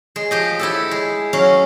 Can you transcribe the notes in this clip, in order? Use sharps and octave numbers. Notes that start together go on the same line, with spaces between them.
G#3
F3 G4 D#5
E4 G4 A4
G#3
F#3 C#4 F5